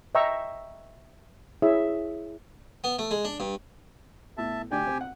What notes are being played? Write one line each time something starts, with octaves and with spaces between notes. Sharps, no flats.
D#5 E5 G5 A#5 C#6 E6
E4 G#4 C#5 E5
B3
A3
G#3
D4
G2
E2 A2 E5 A5
D2 D4 G4 D5 G5 G#5
C3 C4
F#5